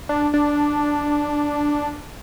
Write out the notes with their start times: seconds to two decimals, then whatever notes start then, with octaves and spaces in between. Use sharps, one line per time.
0.09 D4
0.34 D4